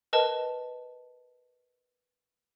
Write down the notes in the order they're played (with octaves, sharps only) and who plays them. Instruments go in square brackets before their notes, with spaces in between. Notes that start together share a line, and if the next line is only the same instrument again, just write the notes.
[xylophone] A#4 B4 D#5 A5